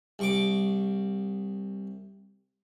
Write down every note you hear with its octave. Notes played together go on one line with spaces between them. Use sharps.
C2 C#6 D6